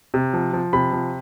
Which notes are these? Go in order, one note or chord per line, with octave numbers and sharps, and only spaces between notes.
C3
F3
F3
C3 B5
F3